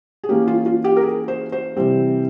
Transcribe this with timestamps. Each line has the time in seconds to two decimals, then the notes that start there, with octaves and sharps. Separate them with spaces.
0.24 G#4
0.29 E3 A#3 C#4 G4
0.48 F4
0.66 F4
0.84 G4
0.97 A#4
1.03 G#4
1.28 C5
1.52 C5
1.77 C3 E3 G3 C4